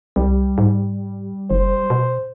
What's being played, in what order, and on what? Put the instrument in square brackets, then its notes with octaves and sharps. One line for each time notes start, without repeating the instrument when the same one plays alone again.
[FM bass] C2 [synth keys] G3
[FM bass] G#2
[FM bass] F#1 [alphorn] C5
[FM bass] B2